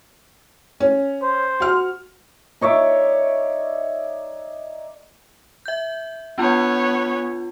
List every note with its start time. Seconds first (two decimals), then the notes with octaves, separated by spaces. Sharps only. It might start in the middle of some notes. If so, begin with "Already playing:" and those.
0.80 C#4
1.23 C5
1.60 F#4 F6
2.61 D#4 C#5 D5 E5
5.66 E5 G6
6.38 B3 D4 F4 C#5 G#5